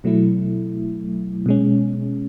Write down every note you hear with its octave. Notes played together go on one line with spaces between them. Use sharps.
B2 F#3 A3 E4
B2 G#3 C#4